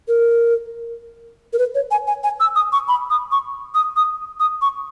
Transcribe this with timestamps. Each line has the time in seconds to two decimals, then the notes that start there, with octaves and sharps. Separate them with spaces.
0.08 A#4
1.53 A#4
1.59 B4
1.75 C#5
1.91 G#5
2.07 G#5
2.24 G#5
2.40 E6
2.56 D#6
2.72 C#6
2.88 B5
3.10 D#6
3.32 C#6
3.75 D#6
3.96 D#6
4.40 D#6
4.62 C#6